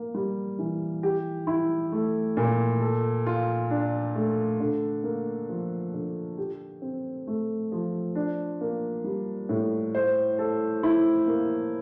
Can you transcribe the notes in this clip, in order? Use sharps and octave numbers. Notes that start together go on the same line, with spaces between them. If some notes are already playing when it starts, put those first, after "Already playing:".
Already playing: A#3
G3
E3
G4
E4
A3
A#2
A4
F4
D4
A3
D3
A#3
F3
D3
G4
C4
A3
F3
D4
A#3
G3
A2
C5
A4
E4
A#3